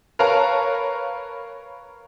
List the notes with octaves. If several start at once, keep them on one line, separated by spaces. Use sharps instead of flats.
A#4 B4 C#5 F5 A5 A#5